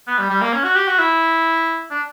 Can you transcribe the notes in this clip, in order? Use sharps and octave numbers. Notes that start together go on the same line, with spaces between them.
B3
G3
G3
A#3
C#4
F#4
G4
F#4
E4
D4